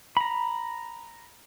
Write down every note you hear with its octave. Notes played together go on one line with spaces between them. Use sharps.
A#5 B5